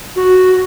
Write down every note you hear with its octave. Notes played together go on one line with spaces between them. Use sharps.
F#4